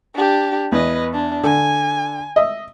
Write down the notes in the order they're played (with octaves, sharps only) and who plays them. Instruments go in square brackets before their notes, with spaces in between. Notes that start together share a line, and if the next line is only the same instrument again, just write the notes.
[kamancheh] D4 G4
[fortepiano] E2 [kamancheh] B4 D#5
[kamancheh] D4
[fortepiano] D3 [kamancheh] G#5
[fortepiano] D#5 E5